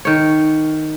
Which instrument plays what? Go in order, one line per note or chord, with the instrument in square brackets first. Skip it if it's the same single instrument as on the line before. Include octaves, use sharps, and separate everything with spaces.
[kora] D#3 C#5